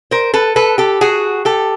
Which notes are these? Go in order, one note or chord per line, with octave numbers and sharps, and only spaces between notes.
A#4 C5
A4 B4
A4 B4
G4 A4
F#4 G#4
G4 A4